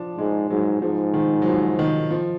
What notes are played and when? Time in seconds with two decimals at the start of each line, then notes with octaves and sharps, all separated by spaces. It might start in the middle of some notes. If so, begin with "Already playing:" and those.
Already playing: F3 D4
0.18 G#2 G#3
0.50 G#2 F#3
0.82 G#2 F3
1.14 D#3
1.42 F#3
1.47 F3
1.79 D#3
2.11 F3